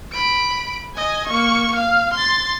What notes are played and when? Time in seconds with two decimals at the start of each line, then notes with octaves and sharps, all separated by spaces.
0.13 B5 D7
0.95 D#5 G#5
1.28 A#3 C#6
1.76 F5
2.14 C6 A6